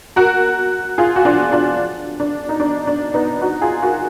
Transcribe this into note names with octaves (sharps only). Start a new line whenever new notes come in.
F#4 A#4
F4 G#4
F#4
D4 F4
D4 F4
D4
D#4
D4
D4
B3 D#4
D#4 F#4
F4 G#4
F#4 A#4